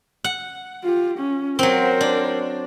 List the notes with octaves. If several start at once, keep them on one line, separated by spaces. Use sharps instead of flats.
F#5
F4 G4
C#4
F#3 C4 A#4 C5
D4